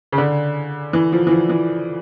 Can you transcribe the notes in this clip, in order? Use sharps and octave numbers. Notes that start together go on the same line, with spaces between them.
C#3
D3
E3
F3
E3
F3
E3